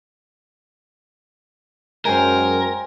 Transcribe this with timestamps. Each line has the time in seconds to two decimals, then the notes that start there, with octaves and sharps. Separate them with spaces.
2.05 F#2 F#3 G#3 A#4 C5 G5 G#5